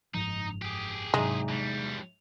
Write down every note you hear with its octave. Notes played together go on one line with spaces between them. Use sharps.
F#1 G#2 F3 D#4
G4 G#4
E2 G#2 C3 F#3 G#3 D#4
B2 G3